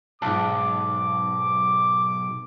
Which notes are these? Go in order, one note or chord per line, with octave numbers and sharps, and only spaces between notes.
B1 G#2 A5 D6